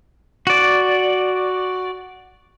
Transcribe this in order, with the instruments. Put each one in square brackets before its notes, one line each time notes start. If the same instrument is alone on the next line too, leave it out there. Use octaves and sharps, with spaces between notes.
[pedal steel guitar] F#4 D5